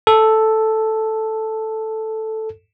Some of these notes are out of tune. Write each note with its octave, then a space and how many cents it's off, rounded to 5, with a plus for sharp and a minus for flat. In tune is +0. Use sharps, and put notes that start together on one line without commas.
A4 +0